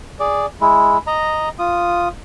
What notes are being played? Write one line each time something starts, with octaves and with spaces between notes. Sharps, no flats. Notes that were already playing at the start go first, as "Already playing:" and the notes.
G#4 D5
G#3 E4
D#5 A#5
F4 D#6